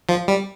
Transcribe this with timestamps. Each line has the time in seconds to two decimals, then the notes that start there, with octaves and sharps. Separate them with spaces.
0.09 F3
0.28 G3